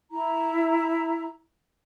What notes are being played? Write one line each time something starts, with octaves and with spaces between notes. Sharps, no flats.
E4 A#5